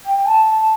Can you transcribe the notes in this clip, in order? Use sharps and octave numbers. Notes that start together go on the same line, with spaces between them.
G5
A5
A5